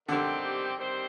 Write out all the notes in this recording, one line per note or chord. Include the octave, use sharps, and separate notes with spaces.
D3 D#3 G3 C4 G4 C5
D#3 G3 C4 G4 C5